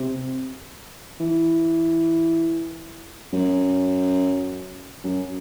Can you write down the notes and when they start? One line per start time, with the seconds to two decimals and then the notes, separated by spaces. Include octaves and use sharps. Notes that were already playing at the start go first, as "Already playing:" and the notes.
Already playing: C3
1.20 E3
3.33 F#2
5.04 F#2